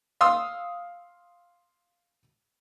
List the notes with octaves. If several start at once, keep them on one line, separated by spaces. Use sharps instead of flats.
F5 C6 D#6 E6